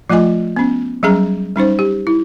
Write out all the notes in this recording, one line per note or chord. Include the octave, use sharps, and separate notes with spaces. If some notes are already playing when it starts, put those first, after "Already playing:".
F3 A3 F4 D#5 G#5
B3 C#4
F#3 G3 C#4 G#4 A#5
G3 C#4 D#4 C5
G4
E4